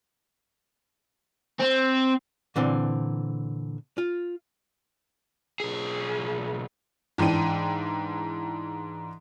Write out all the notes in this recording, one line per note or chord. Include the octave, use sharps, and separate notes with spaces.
C4
A#2 D3 E3 C4
F4
B1 G#4
G#2 E3 D4 G5 D#7